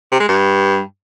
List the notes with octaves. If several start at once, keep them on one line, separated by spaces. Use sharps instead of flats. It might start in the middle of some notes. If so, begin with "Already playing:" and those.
C3
G#3
G2